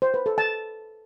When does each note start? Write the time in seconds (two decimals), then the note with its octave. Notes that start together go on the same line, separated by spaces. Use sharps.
0.02 C5
0.14 B4
0.26 A4
0.38 A5